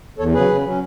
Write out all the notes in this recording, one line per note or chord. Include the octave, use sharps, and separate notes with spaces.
E2 A4 C#5
C#3 F#3 G#4 B4
C#3
F#3 C#4